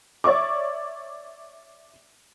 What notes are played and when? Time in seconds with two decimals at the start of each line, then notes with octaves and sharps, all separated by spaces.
0.24 C#5 D5 E5 C#6 D6